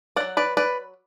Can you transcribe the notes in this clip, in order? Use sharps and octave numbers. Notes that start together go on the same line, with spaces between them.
F#3 C#4 D5 F#5
B4 D5
B4 D5